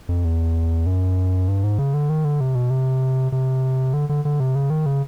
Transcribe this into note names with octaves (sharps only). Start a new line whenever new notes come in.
F2
E2
F#2
G2
G#2
C#3
D3
D#3
D3
C3
B2
C3
C3
D3
D3
D3
C3
C#3
D#3
C#3